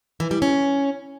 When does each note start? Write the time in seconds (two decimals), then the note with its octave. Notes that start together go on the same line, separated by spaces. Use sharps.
0.20 E3
0.31 G3
0.42 C#4